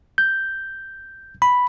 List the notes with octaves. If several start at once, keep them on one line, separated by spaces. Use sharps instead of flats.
G6
B5